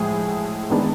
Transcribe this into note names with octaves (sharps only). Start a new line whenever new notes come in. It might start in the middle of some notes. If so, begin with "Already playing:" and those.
Already playing: A2 F3 G#3 G#4
D#3 G#3 B3 D4